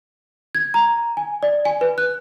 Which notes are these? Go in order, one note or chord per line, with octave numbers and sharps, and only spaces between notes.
G#6
A#5
G#5
D5
G#5
B4
F#6